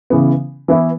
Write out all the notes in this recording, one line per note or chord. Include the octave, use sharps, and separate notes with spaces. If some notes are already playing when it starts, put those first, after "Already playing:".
C#3 E3 B3
E3 B3 E4